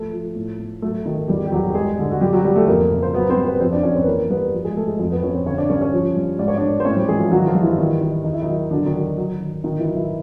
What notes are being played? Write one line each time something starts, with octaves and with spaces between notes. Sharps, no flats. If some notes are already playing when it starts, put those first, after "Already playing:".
Already playing: F3 A3 A4
F3
A2
A2
F#3 A3 A4
D#3
E2 G3 G4
G4
E2 F#3 F#4
G4
G2 G#3 G#4
D3
F#4
F#2 G3 G4
F#3 F#4
F#3 G3 G4
A3 A4
F2 A#3 A#4
C#3
C5
F#3 B3 B4
C4 C5
G2
B3 B4
F2 C4 C5
D4 D5
F2 C#4 C#5
C4 C5
B4
E3 A#3 A#4
G2 B3 B4
F3
G#3 G#4
F3 A3 A4
G#3 G#4
F2
B3 B4
F2 C#4 C#5
C4 C5
D3 C#4 C#5
D4 D5
G2 C#4 C#5
C#4 C#5
F3
G2
G#2 D5
C#5
G#2 D4 D5
C5
A2 C#4 C#5
G3 G4
E3 G#3 G#4
F3 F4
D#3 F#3 F#4
F3 F4
G2
E3 E4
D#3
D#3
E2 D#4
E4
D#3 D#4
F#3
D3 F#3 D4
D#3 D#4
F#3
F#3
D#3
D3 D#3 D#4
E3 E4
F#3
E3 E4